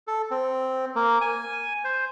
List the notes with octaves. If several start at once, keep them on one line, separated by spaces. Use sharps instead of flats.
A4
C4
A#3
G#5
C5